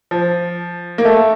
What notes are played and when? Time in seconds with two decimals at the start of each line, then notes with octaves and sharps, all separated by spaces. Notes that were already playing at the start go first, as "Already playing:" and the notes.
0.11 F3
0.98 A#3
1.05 A3